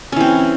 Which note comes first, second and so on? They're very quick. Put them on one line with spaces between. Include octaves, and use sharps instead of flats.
C#4 E3 C4